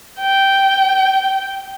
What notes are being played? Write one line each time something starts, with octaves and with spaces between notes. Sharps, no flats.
G5